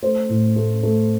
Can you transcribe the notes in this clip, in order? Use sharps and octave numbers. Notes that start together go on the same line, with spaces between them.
A3 C5
A2
A3
A3